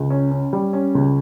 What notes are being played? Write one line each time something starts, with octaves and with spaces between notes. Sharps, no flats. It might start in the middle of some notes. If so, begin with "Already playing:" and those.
Already playing: C#2
C#4
C#4
G3
C#4
C#2